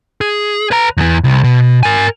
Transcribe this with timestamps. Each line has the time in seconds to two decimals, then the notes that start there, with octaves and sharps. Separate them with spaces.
0.21 G#4
0.71 B4 A#5
0.97 E2 E3
1.24 C2
1.44 B2
1.83 A#4 G#5